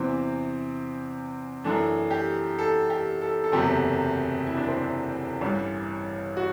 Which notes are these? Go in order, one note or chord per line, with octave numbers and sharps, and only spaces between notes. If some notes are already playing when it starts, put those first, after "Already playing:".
Already playing: E2 C3 E3 C4
F#2 E3 A3 D4
G4
A4
G4
A4
A4
F#1 E2 C3 F#3 A3 G4
E4
D4
C4
D4
A1 G2 E3 G3
F#4